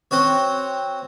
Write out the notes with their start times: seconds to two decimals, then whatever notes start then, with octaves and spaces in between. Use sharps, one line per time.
0.11 C4 F#4 C#5